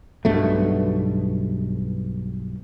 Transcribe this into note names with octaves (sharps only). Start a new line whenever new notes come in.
B1 G2 B2 A3